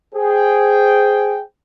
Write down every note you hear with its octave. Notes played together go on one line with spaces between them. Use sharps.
G#4 C5 G5